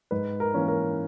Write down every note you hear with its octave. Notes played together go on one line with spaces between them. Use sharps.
G#2 B4
A#4
E3 A#3 C#4
A#4